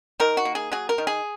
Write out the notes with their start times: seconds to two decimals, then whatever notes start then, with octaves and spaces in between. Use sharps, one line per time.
0.20 D#3 A#4
0.37 F#4
0.45 A#3
0.55 G#4
0.72 F#3 G#4
0.89 A#4
0.98 D#3
1.07 G#4